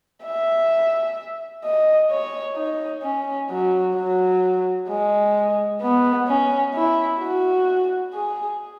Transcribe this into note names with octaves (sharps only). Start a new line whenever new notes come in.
E5
D#5
C#5
D#4
C#4
F#3
F#3
G#3
B3
C#4
E4
F#4
G#4